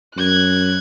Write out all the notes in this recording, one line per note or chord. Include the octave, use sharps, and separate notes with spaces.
F#2 F#6 G#6